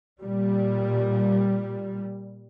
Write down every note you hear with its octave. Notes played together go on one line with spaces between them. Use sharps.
A#2 G3